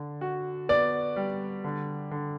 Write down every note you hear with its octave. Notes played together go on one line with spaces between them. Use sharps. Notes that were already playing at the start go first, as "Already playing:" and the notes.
Already playing: D3
F#4
B3 D5
G3
D3
D3